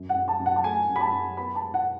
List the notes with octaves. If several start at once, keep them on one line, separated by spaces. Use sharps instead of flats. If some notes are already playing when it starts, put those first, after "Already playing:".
Already playing: F#2
F#5
F#2
A5
F#2
F#5
A5
A3 G#5
F#2
B5
A5
F#2
B3 B5
A5
G#3
F#5